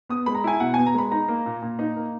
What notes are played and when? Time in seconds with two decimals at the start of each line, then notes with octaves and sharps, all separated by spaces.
0.09 B3 D#6
0.26 G#3 B5
0.35 A#5
0.44 E4 G#5
0.60 B2 F#5
0.74 B3 G#5
0.86 A#5
0.94 G#3 B5
1.11 D#4 A#5
1.28 A#3
1.46 A#2
1.62 A#2
1.79 D#4
1.96 A#3